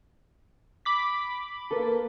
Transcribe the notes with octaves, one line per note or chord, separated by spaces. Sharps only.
B5 D6 B6
A#3 A4 B4